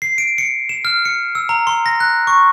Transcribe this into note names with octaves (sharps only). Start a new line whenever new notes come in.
C7
D7
C#7
E7
F6
C#7
E6
A#5
C6
A#6
F#6
C#6